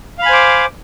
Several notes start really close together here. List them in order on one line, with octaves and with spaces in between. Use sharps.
F5 B5 G#5 C5 D6